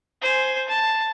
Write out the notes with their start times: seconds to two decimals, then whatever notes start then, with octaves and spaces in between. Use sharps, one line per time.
0.22 C5 G#5
0.68 A5